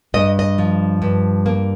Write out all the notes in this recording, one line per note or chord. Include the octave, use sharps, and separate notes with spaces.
G2 D#5
D#5
F3
G2
A#3